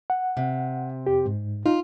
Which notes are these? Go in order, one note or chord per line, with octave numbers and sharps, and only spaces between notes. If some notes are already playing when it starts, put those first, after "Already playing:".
F#5
C3
F2 G4
G#2
D#4 F4